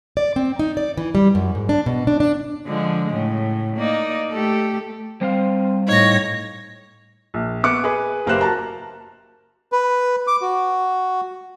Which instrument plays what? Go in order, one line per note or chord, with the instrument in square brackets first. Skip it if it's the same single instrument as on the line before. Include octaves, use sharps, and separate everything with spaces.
[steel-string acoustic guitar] D5
C4
D#4
D5
E3
G3
F#2
G#2
D4
B2
D4
D4
[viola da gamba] D3 F3 G#3
A2 C#3
A#3 D#4 D5
A3 G4 A4
[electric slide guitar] G3 C5 F5 [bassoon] C4
[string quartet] A2 A#6 [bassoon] D#4 [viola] C#5
[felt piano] A#1
B3 E5 D6 F#6 C#7
G#4 B4
F#1 A#3 G4 C5 F#6 E7
F#4 A5 A#5
[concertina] B4
D6
F#4